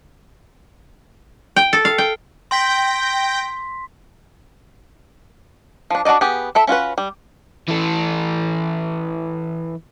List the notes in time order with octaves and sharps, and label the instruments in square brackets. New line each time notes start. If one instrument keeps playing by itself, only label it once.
[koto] G5
A4
F5
G5
[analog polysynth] G5 G6 A#6 [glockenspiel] C6 B6
[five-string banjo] F3 D4
D4 F#4 A#4 D5 D#5
B3 G4 G#4
E4 A4 E5
C#4 F4 F#4 B4
G3
[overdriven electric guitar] E3 A4